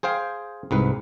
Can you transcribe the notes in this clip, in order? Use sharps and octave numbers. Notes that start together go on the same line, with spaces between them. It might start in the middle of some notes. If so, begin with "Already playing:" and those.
G#4 C5 F5 G5
C2 G#2 B4